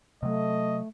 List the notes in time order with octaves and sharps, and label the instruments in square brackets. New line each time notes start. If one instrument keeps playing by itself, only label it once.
[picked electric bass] C3 F#3 [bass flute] A3 [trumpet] D#5